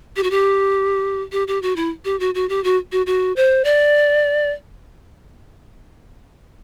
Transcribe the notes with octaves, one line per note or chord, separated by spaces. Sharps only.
G4
F#4
G4
G4
G4
F#4
E4
G4
F#4
F#4
G4
F#4
F#4
F#4
C5
D5